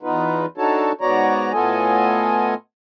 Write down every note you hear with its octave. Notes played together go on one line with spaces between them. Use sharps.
E2 B3 D#4 F4 B4
D4 D#4 F#4 A4 C#5 A5
G#2 B3 F#4 C#5 D5 A#5
A2 B3 F4 A4 D#5 G#5